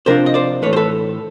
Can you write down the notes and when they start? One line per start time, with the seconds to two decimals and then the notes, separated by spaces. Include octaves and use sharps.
0.06 C3 F3 A3 D4 F4 A#4 C5
0.26 D#5
0.34 C5 D5
0.62 A2 E3 A3 B4 C#5
0.73 C5
0.76 A4 B4